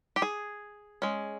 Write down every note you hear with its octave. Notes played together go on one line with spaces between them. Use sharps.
G4
G#4
G#3 C#4